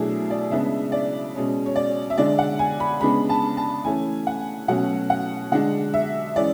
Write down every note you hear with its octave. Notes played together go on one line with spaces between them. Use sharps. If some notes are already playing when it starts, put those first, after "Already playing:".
Already playing: B2 F#3 A3 D4 E4 G#4
D5
C#3 G#3 B3 D4 E5
D5
B2 G#3 C#4
C#5
D5
E5
D3 G#3 D4 D5
F#5
G#5
B5
C#3 G#3 B3 D4 B5
A5
A5
E3 A3 C#4 G#5
F#5
B2 F#3 A3 C#4 F#5
F#5
D3 G#3 D4 F#5
E5
E3 G#3 C#4 D5